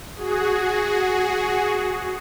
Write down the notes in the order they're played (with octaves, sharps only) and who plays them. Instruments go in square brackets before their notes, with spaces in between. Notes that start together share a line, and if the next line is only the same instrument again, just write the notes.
[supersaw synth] F#4 G#4